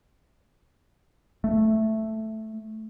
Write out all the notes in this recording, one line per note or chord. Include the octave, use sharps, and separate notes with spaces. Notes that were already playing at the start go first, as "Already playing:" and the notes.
A3